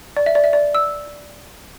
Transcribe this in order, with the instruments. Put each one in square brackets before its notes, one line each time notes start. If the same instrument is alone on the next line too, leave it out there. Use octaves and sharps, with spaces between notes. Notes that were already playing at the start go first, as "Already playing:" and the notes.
[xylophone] D5
E5
D5
E5
D5
E6